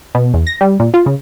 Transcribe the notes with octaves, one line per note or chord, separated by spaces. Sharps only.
B2
E2
A#6
G3
A#2
F4
C#3